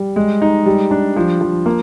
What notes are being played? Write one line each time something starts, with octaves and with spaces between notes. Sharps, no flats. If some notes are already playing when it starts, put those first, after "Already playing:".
Already playing: G3
G#3
D#4
G3
D4
F3
F3
A#3